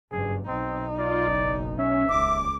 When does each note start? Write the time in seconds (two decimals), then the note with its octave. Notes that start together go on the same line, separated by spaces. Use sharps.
0.11 F#1 G2 G#4
0.48 B1 C4 D#4
0.98 F4 D5
1.28 F#1
1.79 C#4 E5
2.09 D#1 C#2 D6